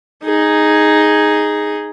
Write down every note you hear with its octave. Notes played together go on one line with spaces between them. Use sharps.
D#4 G#4